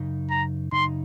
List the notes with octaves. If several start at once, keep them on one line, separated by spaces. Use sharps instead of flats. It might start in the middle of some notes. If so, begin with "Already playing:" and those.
Already playing: F#2 C#3 D#4
A#5
F#2 C#3 D#4 C6